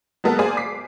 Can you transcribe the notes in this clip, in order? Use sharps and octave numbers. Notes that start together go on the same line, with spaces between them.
F#3 G#3 A#3 B3 A4 A#4
A#3 G#4 C5 D5 F5 G#5
D6 B6 C7